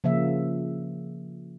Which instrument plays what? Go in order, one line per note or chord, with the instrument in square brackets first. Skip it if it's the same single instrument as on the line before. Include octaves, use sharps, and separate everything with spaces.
[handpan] C#3 F3 A#3 E5